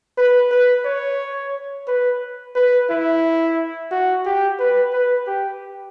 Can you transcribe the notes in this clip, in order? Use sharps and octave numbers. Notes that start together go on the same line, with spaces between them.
B4
B4
C#5
B4
B4
E4
F#4
G4
B4
B4
G4